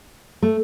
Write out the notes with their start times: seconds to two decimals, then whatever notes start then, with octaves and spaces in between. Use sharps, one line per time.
0.42 A3